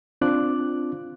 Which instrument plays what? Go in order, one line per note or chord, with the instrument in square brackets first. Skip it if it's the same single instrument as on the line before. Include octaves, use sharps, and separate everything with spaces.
[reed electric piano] C4 D4 F4 D6 F#6